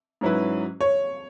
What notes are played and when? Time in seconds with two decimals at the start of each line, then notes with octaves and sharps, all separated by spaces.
0.21 G#2 F#3 C#4 E4 B4
0.81 C#5